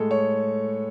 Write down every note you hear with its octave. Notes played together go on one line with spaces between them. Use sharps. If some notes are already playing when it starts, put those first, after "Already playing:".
Already playing: A2 G#3 A4
C#5